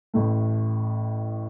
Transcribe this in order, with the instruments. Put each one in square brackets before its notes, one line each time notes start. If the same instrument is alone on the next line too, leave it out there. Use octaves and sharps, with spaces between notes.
[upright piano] A1 A2 A3